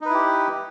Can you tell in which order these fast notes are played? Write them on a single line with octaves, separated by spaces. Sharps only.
D#4 B4 E4 G4